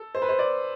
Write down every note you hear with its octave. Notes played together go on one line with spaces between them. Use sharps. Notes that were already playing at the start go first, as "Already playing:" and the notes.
Already playing: A4
C5
B4
C5
D5